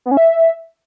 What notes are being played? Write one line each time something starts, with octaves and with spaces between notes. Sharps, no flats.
B3
C#4
E5